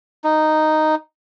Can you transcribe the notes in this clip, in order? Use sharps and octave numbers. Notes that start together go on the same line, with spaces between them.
D#4